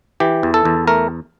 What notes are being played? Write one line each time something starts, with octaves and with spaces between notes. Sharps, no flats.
E3 G4
E2
A4
E2
A3 A#4